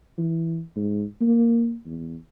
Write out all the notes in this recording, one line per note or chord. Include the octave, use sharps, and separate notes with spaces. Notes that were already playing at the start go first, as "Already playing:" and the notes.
E3
G#2
A#3
E2